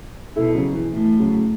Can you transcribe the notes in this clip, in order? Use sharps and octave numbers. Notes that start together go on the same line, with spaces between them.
B2 E4 A4
C#3 F#3
E3
A2 E3
C#3 F#3